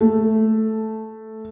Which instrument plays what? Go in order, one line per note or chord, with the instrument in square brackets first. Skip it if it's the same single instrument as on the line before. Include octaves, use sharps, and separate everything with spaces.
[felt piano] A3